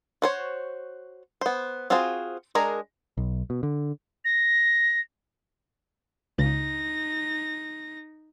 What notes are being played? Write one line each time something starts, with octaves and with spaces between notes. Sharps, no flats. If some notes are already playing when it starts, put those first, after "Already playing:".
F#4 C5 C#5
B3 C5
C4 F4 F#4 G#4 C5
G#3 D4 G#4 A#4 A#5
B1
B2
D3
A#6
C#2 C#3 D#4 A#6